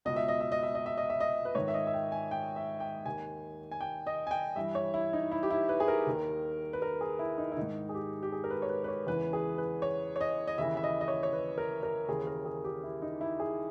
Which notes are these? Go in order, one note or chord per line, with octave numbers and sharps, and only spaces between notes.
C#2 B2 D#5
E5
D#5
E5
D#5
E5
D#5
E5
D#5
E5
D#5
B4
G#2 D#3 C#5
E5
D#5
E5
G5
G#5
G5
E5
G5
D#2 D#3 G#5
G#5
G5
D#5
G#5
G5
G2 E3 E5
C#5
E4
D#4
E4
G4
E4
B4
G#4
A#4
D#2 D#3
B4
A#4
G#4
E4
D#4
E4
G#2 D#3 D#4
G#4
G4
G4
G#4
A#4
B4
C#5
B4
B4
C#5
E2 C#3 E3 B4
G#4
B4
C#5
C#5
D#5
D#5
D#2 C#3 E3 E5
E5
D#5
D#5
C#5
C#5
B4
A#4
A#4
D#2 C#3 E3 G#4
A#4
G#4
G4
E4
D#4
E4
G#4